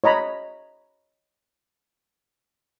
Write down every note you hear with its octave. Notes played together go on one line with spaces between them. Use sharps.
C#5 D#5 A#5 B5